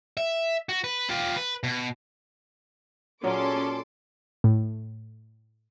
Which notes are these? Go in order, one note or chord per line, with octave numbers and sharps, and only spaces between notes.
E5
F#4
B4
F4 G4
B4
B2
A#2 F#3 C#4 G#4 A4 C6 D6
A2